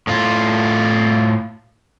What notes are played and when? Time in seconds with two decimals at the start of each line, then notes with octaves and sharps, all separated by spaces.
0.07 A2 F4